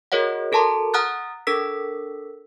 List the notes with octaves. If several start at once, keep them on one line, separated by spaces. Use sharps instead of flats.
F#4 G#4 A#4 C#5 D#5 F#5
F#4 A4 A#4 A5 A#5 C6
F#5 A#5 D#6 F6 F#6 A6
D4 A4 A#4 E6 B6